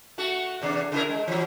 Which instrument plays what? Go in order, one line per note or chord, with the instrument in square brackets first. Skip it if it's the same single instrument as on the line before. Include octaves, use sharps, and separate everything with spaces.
[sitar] A3 F#4
E2 C3 D4
C#3 E4 A#4
G#3
E3 F#3